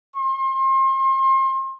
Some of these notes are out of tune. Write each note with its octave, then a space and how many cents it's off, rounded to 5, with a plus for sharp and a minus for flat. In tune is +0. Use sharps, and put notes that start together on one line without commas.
C6 +35